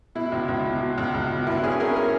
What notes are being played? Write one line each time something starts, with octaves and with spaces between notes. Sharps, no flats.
B2 E4
C#2
C#2
B2
B2
C#2
C#2
B2
G2 E4
C#4 G#4
C#4 A#4
C#4 A#4